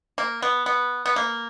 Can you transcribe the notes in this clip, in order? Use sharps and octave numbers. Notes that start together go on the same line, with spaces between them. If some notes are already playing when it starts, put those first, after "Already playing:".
A#3
B3
B3
B3
A#3